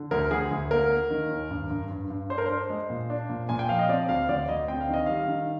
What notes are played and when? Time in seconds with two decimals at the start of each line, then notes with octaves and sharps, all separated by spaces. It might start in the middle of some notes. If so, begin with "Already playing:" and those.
Already playing: D3
0.11 D2 A#4
0.31 D2 G#4
0.51 D2
0.71 A#3 A#4
0.91 A#3
1.10 D#3
1.31 D#2
1.51 G2
1.70 G2
1.90 G2
2.10 G2
2.30 D4 C5
2.38 A#4
2.46 D4 C5
2.70 G#3
2.90 A#2
3.10 D4
3.30 A#2
3.49 A#2 G#5
3.59 G5
3.69 F3 F5
3.79 D#5
3.89 C4 D5
4.09 D2 F5
4.29 D2 D5
4.49 D2 D#5
4.68 C4 G5
4.81 F5
4.89 D#3 D#5
5.06 G3 F5
5.28 D#3